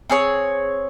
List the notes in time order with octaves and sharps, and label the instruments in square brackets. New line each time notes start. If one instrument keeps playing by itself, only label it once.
[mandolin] C4 G#4 C#5